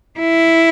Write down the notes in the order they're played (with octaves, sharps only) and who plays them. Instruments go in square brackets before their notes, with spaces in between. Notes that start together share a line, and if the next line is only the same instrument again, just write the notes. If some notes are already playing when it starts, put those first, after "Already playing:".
[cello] E4